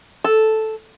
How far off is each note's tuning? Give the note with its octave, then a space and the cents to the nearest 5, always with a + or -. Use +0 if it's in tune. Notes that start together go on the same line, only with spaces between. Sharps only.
A4 -5